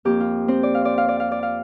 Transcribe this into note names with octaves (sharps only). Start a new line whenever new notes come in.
F2 F3 A#3 G4
F4
C4 C5
D5
F5
D5
F5
D5
F5
D5
F5